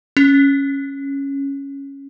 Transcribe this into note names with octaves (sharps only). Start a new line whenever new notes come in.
C#4